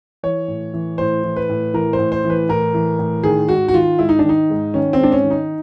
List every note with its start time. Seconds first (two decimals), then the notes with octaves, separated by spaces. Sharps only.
0.23 E3 C#5
0.48 A2
0.74 E3
0.98 A2 C5
1.24 E3
1.36 B4
1.49 A2
1.74 E3 A#4
1.93 C5
1.99 A2
2.12 C5
2.24 E3
2.30 B4
2.49 A2 A#4
2.74 E3
2.99 A2
3.23 D#3 G#4
3.49 G#2 F#4
3.68 F#4
3.74 D#3 F4
3.99 G#2 E4
4.09 D#4
4.19 D4
4.24 D#3
4.29 D#4
4.50 G#2
4.74 D#3 C#4
4.93 C4
5.00 G#2 D4
5.12 C#4
5.24 D#3
5.30 D#4